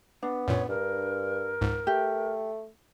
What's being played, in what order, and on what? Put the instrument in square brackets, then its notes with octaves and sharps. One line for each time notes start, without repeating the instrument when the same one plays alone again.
[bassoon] B3 [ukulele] D4
[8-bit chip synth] F#2 A#2 [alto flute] C#5
[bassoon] G2 [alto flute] A#4
[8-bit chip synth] C#2 G#2
[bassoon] A3 [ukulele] G4